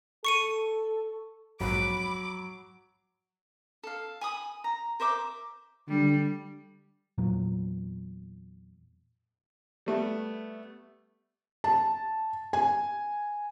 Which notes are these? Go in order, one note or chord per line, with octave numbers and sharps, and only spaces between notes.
A4 C#6 C#7 D#7
A#1 F2 G#2 F#3 B5 D6
A4 F5
G#5 B5 D#6
A#5
A#4 C5 E5 D6
D3 G3
E2 A#2 F#3
G3 A3 B3
A5
G#5